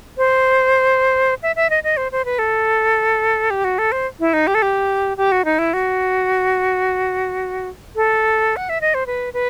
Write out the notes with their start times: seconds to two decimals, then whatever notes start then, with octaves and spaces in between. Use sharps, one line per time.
0.18 C5
1.43 E5
1.56 E5
1.70 D#5
1.84 D#5
1.97 C5
2.12 C5
2.25 B4
2.39 A4
3.50 G4
3.64 F#4
3.78 A4
3.92 C5
4.20 E4
4.33 D#4
4.47 G4
4.55 A4
4.62 G4
5.17 G4
5.32 F#4
5.45 D#4
5.59 E4
5.73 F#4
7.96 A4
8.56 F#5
8.69 E5
8.81 D#5
8.94 C5
9.07 B4
9.34 B4